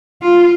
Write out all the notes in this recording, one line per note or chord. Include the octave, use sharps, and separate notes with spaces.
F4